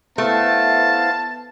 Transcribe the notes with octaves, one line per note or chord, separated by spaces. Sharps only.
A3 B3 E4 C5 F5 A5